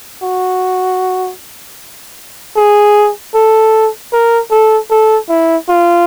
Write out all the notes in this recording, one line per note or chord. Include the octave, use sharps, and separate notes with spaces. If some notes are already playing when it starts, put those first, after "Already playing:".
F#4
G#4
A4
A#4
A4
A4
E4
F4